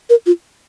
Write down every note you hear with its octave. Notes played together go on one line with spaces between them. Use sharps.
A#4
F4